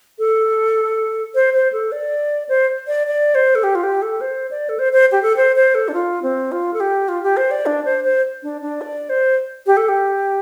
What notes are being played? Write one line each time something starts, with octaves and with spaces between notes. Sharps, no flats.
A4
C5
C5
A4
D5
C5
D5
D5
C5
A4
G4
F4
G4
A4
C5
D5
A4
C5
C5
G4
A4
C5
C5
A4
D4
F4
C4
F4
A4
G4
F4
G4
C5
D5
D4
C5
C5
D4
D4
D5
C5
G4
A4
G4